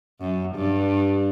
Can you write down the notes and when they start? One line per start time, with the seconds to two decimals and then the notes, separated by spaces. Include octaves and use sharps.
0.21 F#2
0.55 G2